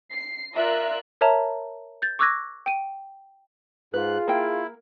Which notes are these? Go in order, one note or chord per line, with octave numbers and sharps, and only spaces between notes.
C7
F4 A#4 D5 E5 F#6
A#4 C#5 E5 A5 A#5
G6 A6
C#6 D6 E6 F#6 G#6 A#6
G5 D#7
G#2 F4 G#4 B4 F#6
A#3 E4 G5